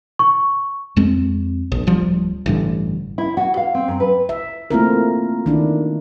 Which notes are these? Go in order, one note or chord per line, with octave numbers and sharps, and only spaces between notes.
C#6
F2 G#3 C4
A#1
D1 F3 G3
A1 G2 D3
E4
F#4
F5
C4
F#2
B4
E5
A3 A#3 C4 E4 F4 A#4
D#3 D4 E4